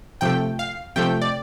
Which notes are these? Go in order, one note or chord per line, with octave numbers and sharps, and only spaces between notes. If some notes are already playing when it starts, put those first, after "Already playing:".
C3 F3 A3 G5
F5
C3 F3 A3 G5
D5